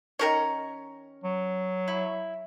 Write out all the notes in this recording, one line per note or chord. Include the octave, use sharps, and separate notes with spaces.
D#3 C#4 A#4 C#5 A#5
F#3
E4